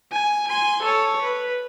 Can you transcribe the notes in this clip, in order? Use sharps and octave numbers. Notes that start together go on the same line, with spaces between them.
G#5
G#5 C6
A4 C#5
B4